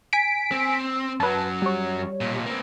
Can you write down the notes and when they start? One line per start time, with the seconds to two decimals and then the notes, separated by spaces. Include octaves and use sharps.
0.13 G#5 B6 D7
0.52 C4
1.20 F#2 F#3 B4 A5
1.62 G3 C#5
2.21 B1 A#2
2.46 A#3 C4